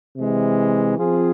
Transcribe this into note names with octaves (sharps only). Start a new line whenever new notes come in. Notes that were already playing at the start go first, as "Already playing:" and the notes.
C3 E3 G#3
F3 C4 F4 G#4